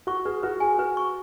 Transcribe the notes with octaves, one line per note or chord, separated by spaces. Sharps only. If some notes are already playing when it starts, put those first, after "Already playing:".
F#4 C#6
G#4 B4
F#4 B4
G#4 G#5
F#4 B4
C#6